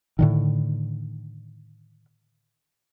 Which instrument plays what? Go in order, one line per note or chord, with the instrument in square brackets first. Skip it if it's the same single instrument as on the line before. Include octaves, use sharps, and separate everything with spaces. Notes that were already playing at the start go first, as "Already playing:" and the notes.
[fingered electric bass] A2 D3 D#3